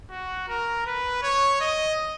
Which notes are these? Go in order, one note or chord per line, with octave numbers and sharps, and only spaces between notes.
F#4
A#4
B4
C#5
D#5